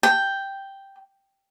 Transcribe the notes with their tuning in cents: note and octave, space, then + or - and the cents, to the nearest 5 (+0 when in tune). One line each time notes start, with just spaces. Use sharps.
G5 +0